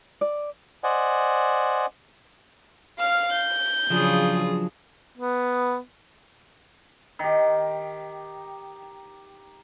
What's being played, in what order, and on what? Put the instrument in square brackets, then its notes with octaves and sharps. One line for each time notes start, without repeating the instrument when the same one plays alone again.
[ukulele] D5
[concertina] C5 D5 D#5 F#5 G#5
[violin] F5 F6
G6
[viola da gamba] C#3 F4 G#4 [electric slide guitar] F3 F#3 D4
[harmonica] B3
[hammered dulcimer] D#3 G4